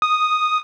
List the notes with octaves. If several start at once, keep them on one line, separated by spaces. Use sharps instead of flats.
D#6